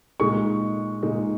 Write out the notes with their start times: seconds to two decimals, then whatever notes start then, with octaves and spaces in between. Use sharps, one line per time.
0.20 A#2 G#3 D#4 C#6
1.03 A#2 G#3 D#4